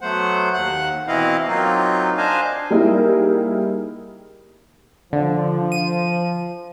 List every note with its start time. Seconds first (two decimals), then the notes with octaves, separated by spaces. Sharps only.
0.01 F#3 A3 B3 C5 F#5
0.53 D#2 F#5 F#6
1.08 B2 E3 C4 E4 D#5 F5
1.48 F#3 A#3 C4 D#4 F4
2.18 D4 C5 D#5 F5 G#5
2.70 G3 A#3 D#4 E4 G#4 A#4
5.13 D3 F3
5.72 D#7